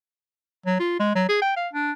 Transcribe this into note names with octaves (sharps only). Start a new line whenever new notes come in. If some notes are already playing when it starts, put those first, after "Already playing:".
F#3
F4
G#3
F#3
G#4
G5
F5
D4